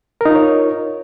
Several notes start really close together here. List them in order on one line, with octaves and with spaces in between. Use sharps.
A#4 D#4 F4 C#5